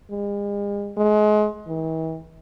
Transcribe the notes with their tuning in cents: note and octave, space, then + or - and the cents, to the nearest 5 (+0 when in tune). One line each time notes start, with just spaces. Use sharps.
G#3 -45
G#3 +30
E3 -45